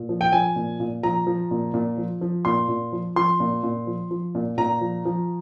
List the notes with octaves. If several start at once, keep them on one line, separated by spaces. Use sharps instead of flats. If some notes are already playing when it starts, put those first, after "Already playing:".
Already playing: A#2
F3
G5
F3 G#5
A#2
A#2
F3 A#5
F3
A#2
A#2
F3
F3
A#2 C6
A#2
F3
F3 C6
A#2
A#2
F3
F3
A#2
A#2 A#5
F3
F3